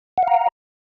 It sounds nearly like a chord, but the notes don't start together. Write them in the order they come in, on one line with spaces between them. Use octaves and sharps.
F#5 F5 A#5